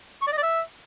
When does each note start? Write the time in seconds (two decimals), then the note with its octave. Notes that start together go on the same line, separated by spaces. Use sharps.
0.22 C#6
0.27 D5
0.32 D#5
0.37 D5
0.43 E5